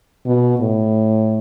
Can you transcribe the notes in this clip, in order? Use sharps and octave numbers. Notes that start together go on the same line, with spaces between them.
B2
A2